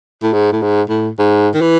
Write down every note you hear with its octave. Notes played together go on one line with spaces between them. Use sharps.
A2
G#2
A2
G#2
A2
G#2
D#3
E3